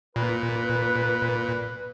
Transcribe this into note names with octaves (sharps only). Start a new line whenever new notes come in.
A#2 B4